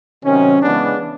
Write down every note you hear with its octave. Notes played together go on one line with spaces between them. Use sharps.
C3 D#3 F#3 C#4
C#3 E3 G#3 B3 D4